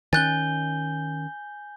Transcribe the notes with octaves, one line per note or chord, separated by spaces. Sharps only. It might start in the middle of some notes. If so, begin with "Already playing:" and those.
D#3 C#4 G#5 F#6 G6 A6 G7